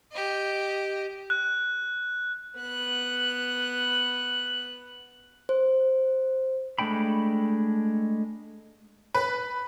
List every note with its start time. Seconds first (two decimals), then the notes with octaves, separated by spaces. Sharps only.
0.12 G4 D#5
1.30 F#6
2.60 B3 F#6
5.49 C5
6.79 G#3 A3 D4 G5 B5
9.15 B4